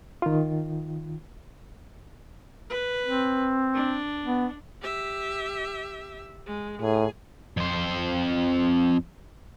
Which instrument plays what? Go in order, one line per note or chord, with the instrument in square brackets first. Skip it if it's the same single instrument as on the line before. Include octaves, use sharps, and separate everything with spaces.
[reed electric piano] D#3 F4
[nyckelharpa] B4
[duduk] C4
[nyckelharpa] D4
[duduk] B3
[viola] G4 E5
G#3
[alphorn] A2 [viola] G#4 G#5
[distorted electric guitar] F2 C5